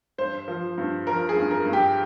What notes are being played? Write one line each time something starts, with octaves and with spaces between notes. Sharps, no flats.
G2 C5
F3
G2
F3 A#4
G#4
G2
A#4
G2
G4